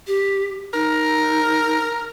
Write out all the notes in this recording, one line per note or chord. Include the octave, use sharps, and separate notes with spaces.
G4
D#4 A#4